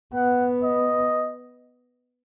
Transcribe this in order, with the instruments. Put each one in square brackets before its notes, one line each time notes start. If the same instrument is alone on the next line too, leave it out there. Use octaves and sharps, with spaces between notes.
[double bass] B3 [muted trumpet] F#5
[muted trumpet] D#5